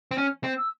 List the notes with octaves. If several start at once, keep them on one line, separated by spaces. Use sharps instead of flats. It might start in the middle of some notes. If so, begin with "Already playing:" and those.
C4
C#4 F6
C4
E6